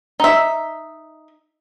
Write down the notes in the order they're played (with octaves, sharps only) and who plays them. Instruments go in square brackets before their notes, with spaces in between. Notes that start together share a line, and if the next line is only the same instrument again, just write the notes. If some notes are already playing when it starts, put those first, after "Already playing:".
[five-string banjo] D#4 E5